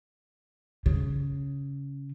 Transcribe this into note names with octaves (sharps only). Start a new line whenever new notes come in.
C#3